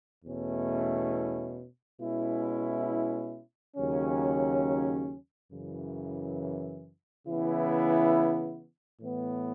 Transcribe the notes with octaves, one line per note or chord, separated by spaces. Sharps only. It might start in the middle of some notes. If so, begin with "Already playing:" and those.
E2 B2 A3 C#4 E4
B2 G#3 C#4 E4
D#2 C#3 F#3 C#4
F#2 C#3 E3
C#3 E3 B3 E4
A2 E3 B3